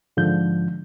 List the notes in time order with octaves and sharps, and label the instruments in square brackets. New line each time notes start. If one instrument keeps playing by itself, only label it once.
[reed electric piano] G#2 D3 F3 G6